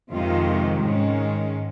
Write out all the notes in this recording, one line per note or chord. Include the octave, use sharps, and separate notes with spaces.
F2 C3 D#3 G#3 F4
G#2 D#3 G#3 C#4